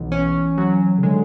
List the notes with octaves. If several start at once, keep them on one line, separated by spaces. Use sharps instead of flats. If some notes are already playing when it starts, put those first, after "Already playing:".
Already playing: B1 E3
C#4
F#3
C#3
D3 G#3